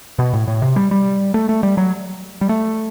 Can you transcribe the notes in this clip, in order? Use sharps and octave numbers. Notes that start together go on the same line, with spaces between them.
B2
A2
A2
C3
G3
G3
A3
A3
G3
F#3
G3
A3